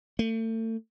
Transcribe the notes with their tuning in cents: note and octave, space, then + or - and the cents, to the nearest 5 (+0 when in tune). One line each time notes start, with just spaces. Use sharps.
A3 +35